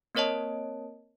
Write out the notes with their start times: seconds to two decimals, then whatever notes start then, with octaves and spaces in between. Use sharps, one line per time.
0.15 A#3 C4 A#4 C#5 D#5 A5